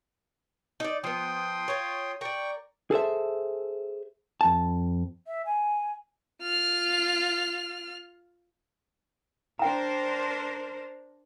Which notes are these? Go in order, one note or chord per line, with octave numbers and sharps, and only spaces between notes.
D#4 D5
F3 B3 G5 C6 D#6
F4 C#5
A#4 D5 G5 C#6
G#4 A4 C5 E5
F2 A5
E5
G#5
F4 F6
D4 A#4 C5 G5 A#5